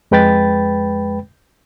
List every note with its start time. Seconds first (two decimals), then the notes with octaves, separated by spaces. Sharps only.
0.11 F2 G#3 B4 G5 B5 A6